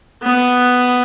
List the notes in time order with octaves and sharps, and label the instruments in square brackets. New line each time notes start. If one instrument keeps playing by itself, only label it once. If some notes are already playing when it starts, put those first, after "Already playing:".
[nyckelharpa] B3